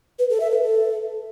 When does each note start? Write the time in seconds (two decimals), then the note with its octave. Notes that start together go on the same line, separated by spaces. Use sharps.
0.19 B4
0.30 A4
0.40 E5
0.51 B4
0.62 A4